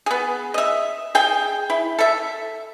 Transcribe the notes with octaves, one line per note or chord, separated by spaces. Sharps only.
B3 G#4
D#5 E5
G#4 G5
E4
A4 E5